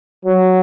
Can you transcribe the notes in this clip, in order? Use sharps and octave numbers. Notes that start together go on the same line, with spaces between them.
F#3